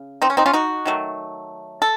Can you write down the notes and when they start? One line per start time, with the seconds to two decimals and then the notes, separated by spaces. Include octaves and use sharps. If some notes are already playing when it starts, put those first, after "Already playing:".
Already playing: C#3
0.22 C4 D#4
0.30 C#4
0.37 C4 D#4
0.46 C#4 F4
0.53 D#4 F#4
0.86 D#3 F#3 A3
1.82 A4